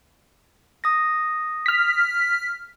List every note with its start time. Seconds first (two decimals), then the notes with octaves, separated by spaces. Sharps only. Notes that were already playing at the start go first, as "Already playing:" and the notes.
0.84 D#6 A#6
1.66 F6 B6